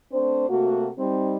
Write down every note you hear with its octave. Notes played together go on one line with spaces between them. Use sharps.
A3 C4 D4 C5
C3 A3 A#3 F#4
G3 C4 D#4